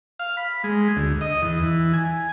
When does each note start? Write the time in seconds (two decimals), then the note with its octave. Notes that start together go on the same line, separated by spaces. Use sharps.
0.19 F5
0.37 B5
0.64 G#3
0.97 D2
1.21 D#5
1.42 E2
1.63 E3
1.94 G#5